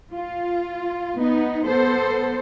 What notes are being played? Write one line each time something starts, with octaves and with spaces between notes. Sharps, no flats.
F4
B3 D#4
B3 A4 C5